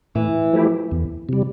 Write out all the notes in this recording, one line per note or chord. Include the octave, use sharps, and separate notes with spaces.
A2 E3
F3 A3 E4 G4
E2
C3 G3